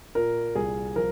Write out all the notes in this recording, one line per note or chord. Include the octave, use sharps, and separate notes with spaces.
A#2 A#4
C2 G#4
F3 A#4